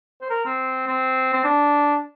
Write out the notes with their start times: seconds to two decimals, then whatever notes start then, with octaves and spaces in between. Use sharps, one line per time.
0.22 C5
0.30 A#4
0.46 C4
0.87 C4
1.33 C4
1.44 D4